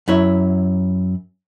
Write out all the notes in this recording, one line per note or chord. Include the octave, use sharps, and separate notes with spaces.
F#2 E4 C#5